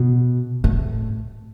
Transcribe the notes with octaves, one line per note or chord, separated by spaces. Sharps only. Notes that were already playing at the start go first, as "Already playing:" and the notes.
Already playing: B2
A2